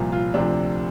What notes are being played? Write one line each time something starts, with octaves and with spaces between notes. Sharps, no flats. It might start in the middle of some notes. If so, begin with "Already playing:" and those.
Already playing: C2 A#2 F3
F4
D2 C3 F3 D4